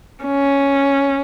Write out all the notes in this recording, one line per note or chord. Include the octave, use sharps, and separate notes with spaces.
C#4